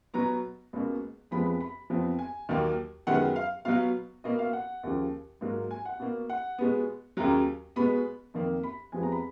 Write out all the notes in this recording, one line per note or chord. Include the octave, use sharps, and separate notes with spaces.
B2 F#3 B3 A#5
C#2 B2 A#3
F2 F3 G#3 B3 B5
B5
B5
F2 F3 B3
G#5
D#2 D#3 F#3 A#3
F#2 D#3 G#3 B3 F#5
F5
B2 F#3 B3 F5
B2 A#3 D#5
F5
F#5
D#2 C#3 F3
G#2 F#3 A#3
G#5
F#5
B2 A#3
F#5
B2 G#3 B3
D#2 C#3 F#3 A#5
B2 G#3 B3 B5
F2 D#3 A#3
B5
F2 F3 G#3 B3 G#5
A#5
B5